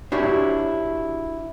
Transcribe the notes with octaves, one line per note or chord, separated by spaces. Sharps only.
D4 E4 F#4 G4 C#5